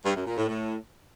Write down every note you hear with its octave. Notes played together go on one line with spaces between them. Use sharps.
G2
F#2
A#2
A2
A2